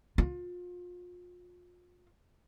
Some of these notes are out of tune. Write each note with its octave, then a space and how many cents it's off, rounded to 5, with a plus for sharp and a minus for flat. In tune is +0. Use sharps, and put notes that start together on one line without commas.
F4 +30